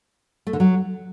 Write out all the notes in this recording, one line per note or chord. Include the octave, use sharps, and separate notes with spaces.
A3
D3
F#3